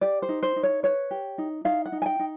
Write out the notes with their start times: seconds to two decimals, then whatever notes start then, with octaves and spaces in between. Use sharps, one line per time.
0.01 G4 D5
0.22 C5
0.29 D#4
0.43 C5
0.56 D#4
0.63 C#5
0.83 B4 C#5
1.11 G4
1.38 D#4
1.65 D#4 F5
1.86 F#5
1.92 D#4
2.02 G#5
2.06 G5
2.19 D#4